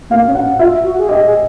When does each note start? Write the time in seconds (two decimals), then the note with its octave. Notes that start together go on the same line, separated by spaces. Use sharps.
0.10 A#3 F5
0.27 C#4
0.35 F#5
0.59 F4 E5
0.84 F#4
0.99 G#4
1.08 G4 D#5
1.25 G#4